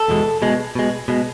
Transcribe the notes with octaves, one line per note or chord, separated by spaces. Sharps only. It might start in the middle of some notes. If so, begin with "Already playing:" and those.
Already playing: A4
E2 B2 G#3
B2 G#3
B2 G#3
B2 G#3